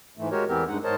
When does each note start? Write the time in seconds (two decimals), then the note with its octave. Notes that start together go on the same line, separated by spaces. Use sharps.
0.17 G#2 E3 A3
0.31 G#3 F#4 G4 A#4 C#5
0.48 E2 E3 B3 C4 G4 A#4
0.68 G2 G#3 D#4 F#5
0.84 G#2 A#4 C5 C#5 D#5 A5